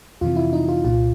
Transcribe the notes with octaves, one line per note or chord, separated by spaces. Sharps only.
F2 C3 E3 F4
E4
D#4
F4
C2 A#2 F4